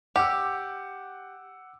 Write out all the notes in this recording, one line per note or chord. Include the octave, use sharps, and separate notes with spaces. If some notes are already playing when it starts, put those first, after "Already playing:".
G4 F#5 D6 E6